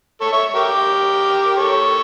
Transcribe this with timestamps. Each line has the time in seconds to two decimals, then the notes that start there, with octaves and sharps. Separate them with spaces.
0.21 A4 C#5
0.32 C#5 E5
0.55 G4 A#4
1.57 A4 C#5